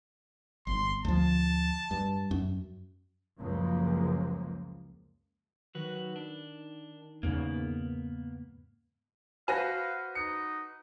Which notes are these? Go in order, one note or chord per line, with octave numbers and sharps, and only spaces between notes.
G1 C6
D2 F3 A5
G2
F#2
C#2 F#2 F3 G#3 A#3
D#3 F#3 F#4 B4
D4
E2 G#2 C#3 A#3 B3
F#4 B4 C5 F5 G#5 A#6
D#4 C#7